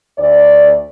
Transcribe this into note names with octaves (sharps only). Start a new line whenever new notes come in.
D2 D5